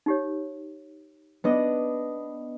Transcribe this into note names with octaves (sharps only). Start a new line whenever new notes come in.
D#4 G4 C#5
B3 D4 D#5